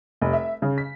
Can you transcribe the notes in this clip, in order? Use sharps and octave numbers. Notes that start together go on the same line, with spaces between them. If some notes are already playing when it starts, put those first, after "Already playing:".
F1
E5
C#3
B6